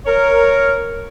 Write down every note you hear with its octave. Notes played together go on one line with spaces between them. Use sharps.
A#4 C#5